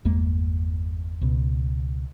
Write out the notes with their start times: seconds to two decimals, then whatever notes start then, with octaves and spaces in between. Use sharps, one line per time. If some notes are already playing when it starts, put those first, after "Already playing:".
0.05 G1 E2 G#3 A#3
1.21 C#2 B2